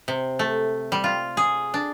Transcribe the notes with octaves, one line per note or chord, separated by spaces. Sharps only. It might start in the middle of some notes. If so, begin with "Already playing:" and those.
C3
A3
G3
F4
G#4
D4